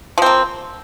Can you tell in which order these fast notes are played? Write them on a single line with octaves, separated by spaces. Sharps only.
F3 C4 A#3